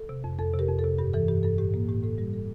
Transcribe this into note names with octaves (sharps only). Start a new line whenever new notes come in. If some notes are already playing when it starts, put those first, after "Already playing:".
Already playing: A4
C3
F2
F2 A4
C3
G4 A#4
F2
A4
C3
G2 G4
E3 A4
G2 G4
G2 A4
A2 G4
A#3 G4
A2 G4
A2 A4
G3 G4
G3 A4